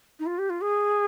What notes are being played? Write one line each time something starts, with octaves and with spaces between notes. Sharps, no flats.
D#4
F4
G4
F4
G#4